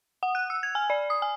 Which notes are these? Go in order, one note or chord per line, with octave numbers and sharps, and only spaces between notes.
F#5
F#6
E6
G#6
G#5
D5
D#6
G#5